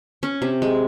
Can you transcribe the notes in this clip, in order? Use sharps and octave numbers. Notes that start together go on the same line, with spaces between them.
C#4
C3
G#3